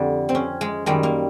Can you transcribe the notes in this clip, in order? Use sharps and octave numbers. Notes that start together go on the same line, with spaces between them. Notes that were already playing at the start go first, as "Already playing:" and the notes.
Already playing: F2 D3 G3
C4
C#4
G#3
F#2 D#3 G3 G#3
A#3